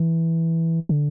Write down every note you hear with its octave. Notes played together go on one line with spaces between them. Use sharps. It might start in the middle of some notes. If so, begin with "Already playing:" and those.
Already playing: E3
D3